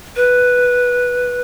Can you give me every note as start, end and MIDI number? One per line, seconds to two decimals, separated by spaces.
0.16 1.42 71